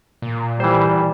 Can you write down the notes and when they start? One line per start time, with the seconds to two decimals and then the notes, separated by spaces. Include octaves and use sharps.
0.22 A#2
0.60 E3 G3 C5